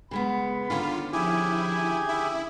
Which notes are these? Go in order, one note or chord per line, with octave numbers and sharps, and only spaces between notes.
C#3 G#3 B3 B5
D3 D#3 C#4 F4
F3 E4 G4 G#4 G#5
E4 E5